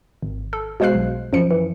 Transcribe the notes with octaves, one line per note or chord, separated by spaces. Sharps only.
G#1
A4
B2 G#3 C5 F5 F#6 C7
B1
F#2 F3 C#7
E3